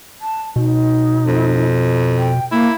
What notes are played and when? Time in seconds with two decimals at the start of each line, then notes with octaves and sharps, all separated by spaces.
0.22 A5
0.56 B2 D#4
1.27 F2
2.18 G5
2.52 A#3 E4